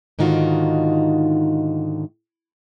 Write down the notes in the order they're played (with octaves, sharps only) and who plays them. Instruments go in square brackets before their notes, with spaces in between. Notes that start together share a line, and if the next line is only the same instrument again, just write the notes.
[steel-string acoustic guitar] G#2 D3 D#3 D#4 F4 F#4